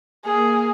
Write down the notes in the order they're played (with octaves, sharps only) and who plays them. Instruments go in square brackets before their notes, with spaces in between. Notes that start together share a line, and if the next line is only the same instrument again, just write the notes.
[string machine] A#3 [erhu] G#4